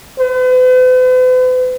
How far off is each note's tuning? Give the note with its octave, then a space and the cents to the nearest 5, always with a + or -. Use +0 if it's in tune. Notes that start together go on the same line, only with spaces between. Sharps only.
B4 +45